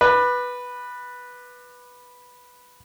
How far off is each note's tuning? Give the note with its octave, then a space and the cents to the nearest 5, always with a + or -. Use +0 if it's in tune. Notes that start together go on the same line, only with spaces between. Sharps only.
B4 -5 D5 +30